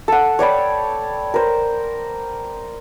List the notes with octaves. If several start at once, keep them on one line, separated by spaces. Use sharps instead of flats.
A4 F#5
C#5 D5 G5 B5
A#4 C5